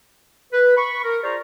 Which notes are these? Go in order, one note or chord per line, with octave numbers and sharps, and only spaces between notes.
B4
B5 C#6
A#4
F4 G#4 C5 D5 A#5 C#6